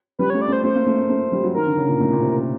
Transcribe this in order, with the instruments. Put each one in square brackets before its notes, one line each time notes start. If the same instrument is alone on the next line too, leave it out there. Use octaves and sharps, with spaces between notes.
[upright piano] G3 [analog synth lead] B4
[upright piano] A3 [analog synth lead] C#5
[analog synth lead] D5
[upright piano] A3 [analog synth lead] C5
[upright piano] A3 [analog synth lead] C5
[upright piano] A#3
A3
A#3
A3
G3
F#3
[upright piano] D#3 [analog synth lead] A#4
[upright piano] D3
C#3
A#2
A2
A#2
C3